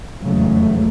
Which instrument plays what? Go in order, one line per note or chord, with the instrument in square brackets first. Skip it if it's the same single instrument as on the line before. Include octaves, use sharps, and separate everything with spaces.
[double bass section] F1 E2 G#2 C#3 F#3 A3